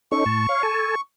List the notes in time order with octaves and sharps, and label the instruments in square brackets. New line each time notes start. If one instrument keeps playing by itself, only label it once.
[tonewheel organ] C#4 D#4 A4 [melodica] C#6
[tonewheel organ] A2 A5
C#5 F5
A4 G#5 A5